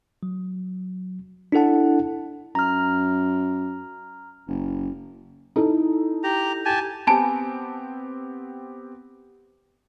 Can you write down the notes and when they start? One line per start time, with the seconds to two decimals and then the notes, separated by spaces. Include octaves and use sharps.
0.23 F#3
1.52 D4 E4 A4 F#5 A5
2.55 F#2 A#5 F6
4.48 F#1
5.56 D#4 E4 A4
6.24 G4 A#5
6.65 G4 G#5 A5
7.07 B3 C4 G4 G#5 A5 B5